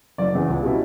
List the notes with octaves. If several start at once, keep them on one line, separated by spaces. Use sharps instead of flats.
F#1 D5
E2 C#3
C#2
B2 G3 C#4 E4